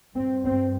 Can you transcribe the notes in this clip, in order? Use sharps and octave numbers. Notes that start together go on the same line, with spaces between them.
G2 C4
C4